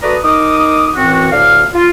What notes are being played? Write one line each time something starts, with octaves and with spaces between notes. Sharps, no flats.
A3 F#4 B4 D5 A#5 D#6
D#4 A#4 D6 D#6
F#2 A2 E3 C4 F#4
D2 A2 D5 F5
F4